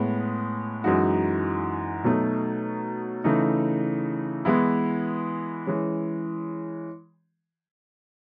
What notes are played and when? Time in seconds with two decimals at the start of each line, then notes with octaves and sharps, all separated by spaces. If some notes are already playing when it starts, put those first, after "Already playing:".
Already playing: A2 G#3 B3
0.84 F#2 E3 G#3 D#4 F#4
2.04 B2 F#3 A3 D#4
3.24 C#3 E3 A3 D#4
4.45 E3 G#3 B3 E4
5.67 E3 G#3 C#4